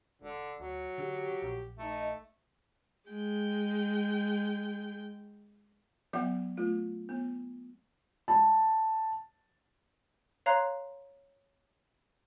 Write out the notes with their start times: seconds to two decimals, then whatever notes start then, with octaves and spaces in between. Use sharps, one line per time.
0.22 E1 D3
0.60 D2 F#3
0.98 D3 G4
1.42 A#1
1.79 A3 D#4
3.09 G#3 G5
6.13 F#3 B3 E5 F#5 G5
6.57 A3 F4
7.09 B3
8.28 A5
10.46 C#5 F5 A#5 C6 F#6